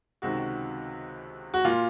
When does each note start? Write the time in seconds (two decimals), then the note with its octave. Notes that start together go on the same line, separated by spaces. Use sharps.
0.22 C#2 C3 D#3 F#4
1.54 F#4
1.65 A#2 F4